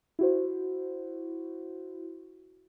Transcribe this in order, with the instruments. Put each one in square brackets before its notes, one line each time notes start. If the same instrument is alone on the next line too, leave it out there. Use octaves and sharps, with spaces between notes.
[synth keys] E4 F#4 C5